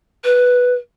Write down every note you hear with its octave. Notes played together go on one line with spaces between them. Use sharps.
B4